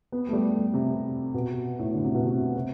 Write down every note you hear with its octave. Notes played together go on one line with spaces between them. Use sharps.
B3
A3
G3
C3
B2
A2
D3
C3
B2
C3
C3